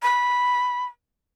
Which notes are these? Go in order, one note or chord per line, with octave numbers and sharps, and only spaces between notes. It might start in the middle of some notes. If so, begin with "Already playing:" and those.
B5